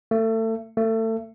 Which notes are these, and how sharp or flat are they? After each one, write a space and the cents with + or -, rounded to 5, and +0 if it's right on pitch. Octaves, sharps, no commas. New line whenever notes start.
A3 +30
A3 +30